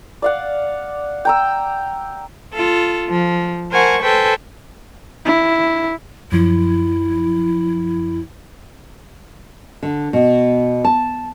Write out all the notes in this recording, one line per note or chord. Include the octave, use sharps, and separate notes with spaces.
D5 F5 F#5
G5 A#5 E6
F4 A4
F3
A#4 C5 F#5 G#5 A5 C#6
A4 B4 C5 G5 G#5
E4
F#2 F3 E4
D3
B2
A5